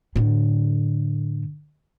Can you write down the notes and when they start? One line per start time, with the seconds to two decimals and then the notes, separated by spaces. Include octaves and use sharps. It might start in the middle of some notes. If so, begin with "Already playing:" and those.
0.16 A2 D3